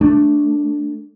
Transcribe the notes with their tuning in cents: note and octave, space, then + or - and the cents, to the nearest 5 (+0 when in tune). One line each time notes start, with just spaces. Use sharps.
A3 +5 D4 +0